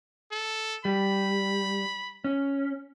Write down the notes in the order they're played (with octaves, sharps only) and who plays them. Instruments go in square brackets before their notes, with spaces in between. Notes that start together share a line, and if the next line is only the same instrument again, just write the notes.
[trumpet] A4
[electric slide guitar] G3 [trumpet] B5
[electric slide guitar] C#4